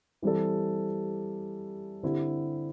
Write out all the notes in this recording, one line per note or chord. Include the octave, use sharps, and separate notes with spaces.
E3 G3 C4 A4
D3 C4 E4 G4